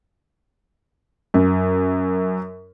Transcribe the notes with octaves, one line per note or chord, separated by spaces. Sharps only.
F#2